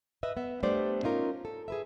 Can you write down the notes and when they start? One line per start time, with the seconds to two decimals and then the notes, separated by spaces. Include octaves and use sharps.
0.23 B4 D#5 E5
0.37 B3 E5
0.63 G3 A3 B3 D4 C5 D5
1.03 C#4 D#4 F4 A#4
1.45 A4
1.68 G#4 B4 E5